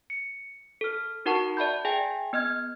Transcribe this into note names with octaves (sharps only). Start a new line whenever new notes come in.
C#7
A4 F6
D#4 F#4 A#4 F#5 A5 C#6
D5 E5 A5 B5 G6
G#4 E5 G5 G#5
B3 D#5 F6 G#6